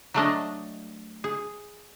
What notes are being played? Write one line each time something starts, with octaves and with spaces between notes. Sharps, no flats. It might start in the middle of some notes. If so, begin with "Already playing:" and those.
F#3 A3 D4 D#5
G#4